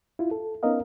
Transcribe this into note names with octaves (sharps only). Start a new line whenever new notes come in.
E4 F4
A4
B3 C#4 D#4 A#4 D#5 F5